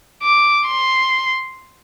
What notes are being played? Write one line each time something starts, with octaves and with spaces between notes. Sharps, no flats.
D6
C6